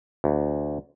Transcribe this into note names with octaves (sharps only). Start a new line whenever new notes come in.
D2